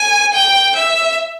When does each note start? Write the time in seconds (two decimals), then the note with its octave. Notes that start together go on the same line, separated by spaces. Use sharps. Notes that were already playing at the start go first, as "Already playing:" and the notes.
Already playing: G#5
0.34 G5
0.76 E5